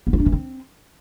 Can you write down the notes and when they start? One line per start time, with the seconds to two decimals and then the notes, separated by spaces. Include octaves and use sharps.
0.07 B3
0.13 F4
0.20 D4
0.26 E3
0.32 C4